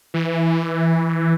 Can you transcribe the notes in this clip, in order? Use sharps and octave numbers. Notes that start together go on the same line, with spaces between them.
E3